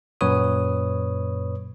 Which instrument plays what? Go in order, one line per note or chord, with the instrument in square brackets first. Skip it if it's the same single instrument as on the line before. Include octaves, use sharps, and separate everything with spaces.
[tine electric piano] F#2 A#2 B4 C#5 D#6